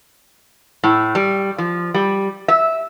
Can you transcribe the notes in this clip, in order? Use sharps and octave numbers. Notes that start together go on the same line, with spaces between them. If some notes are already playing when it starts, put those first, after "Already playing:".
A2
G3
F3
G3
E5